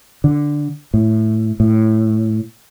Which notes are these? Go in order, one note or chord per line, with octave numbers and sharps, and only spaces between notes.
D3
A2
A2